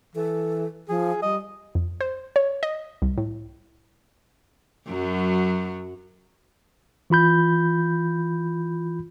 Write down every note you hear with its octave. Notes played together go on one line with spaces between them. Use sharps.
E3 A4
F3 G#4
G3 D#5
F2
C5
C#5
D#5
C2
A2
F#2 F#3
E3 F4 B5 G6